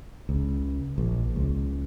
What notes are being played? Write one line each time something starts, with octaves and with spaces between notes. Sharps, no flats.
C#2
A#1
C#2